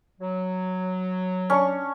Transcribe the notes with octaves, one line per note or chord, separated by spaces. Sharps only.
F#3
C#4 D4 C#6